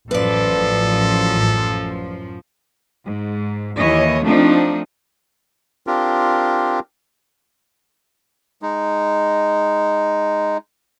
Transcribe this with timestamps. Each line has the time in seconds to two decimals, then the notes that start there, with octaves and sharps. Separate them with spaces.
0.11 A1 F#2 F3 A4 B4 D5
3.04 G#2
3.77 D#2 E3 C#5 D#5
4.24 F3 A3 C4 D4 D#4
5.87 C4 D4 F4 G4 A#4
8.62 G#3 D#4